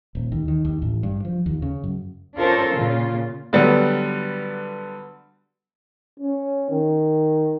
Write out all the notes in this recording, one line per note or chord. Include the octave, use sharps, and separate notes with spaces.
D#1
D#2
D#3
D#2
A1
G2
F3
D#2
C#3
F#2
C#4 D4 F4 A4 A#4 C5
A#2 C#3 F4
D3 F#3 G3 B3
C#4
D#3